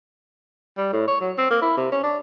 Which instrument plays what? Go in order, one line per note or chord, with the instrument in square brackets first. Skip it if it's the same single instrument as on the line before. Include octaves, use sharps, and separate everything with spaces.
[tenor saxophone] G3
A2
C#5
F#3
C4
A#3
E4
C3
C#4
D4